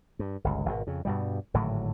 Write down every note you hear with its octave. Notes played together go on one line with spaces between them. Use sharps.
G2
G1 C#2
G#1 B2
F2 C#3
G2 B2 G3
G#1 A2 D3 F#3